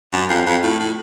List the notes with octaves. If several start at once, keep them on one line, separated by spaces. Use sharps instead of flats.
F#2
F2
F2
A2
A2